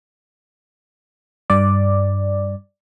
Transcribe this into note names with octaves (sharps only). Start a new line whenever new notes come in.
G2 D5